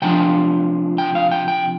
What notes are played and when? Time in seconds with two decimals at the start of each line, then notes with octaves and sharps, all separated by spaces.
0.02 C3 F3 D4 F4 G5
0.98 G5
1.15 F5
1.31 G5
1.48 G5